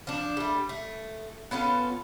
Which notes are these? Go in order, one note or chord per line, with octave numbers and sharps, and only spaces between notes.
F3 D4
G3 A3
A3
B3 C#4 F4 A4